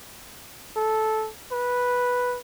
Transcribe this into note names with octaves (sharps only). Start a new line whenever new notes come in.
A4
B4